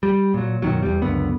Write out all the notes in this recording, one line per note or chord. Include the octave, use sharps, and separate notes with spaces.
G3
A#2 F#3
F#2 B2 D#3 F#3
E2 G3
C#2 F#2 D3 B3